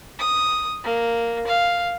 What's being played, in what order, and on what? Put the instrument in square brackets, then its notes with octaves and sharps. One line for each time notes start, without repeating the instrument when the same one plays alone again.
[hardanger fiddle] D#6
A#3
F5